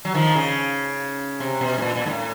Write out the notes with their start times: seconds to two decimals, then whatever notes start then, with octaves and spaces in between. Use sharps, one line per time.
0.05 F#3
0.14 D#3 F3
0.35 C#3
1.40 C3
1.61 B2
1.78 A2
1.82 A#2
1.96 A#2
2.06 G#2
2.10 A2